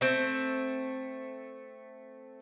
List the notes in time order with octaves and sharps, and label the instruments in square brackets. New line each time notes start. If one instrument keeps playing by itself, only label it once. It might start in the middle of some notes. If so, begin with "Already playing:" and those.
[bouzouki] A3 C4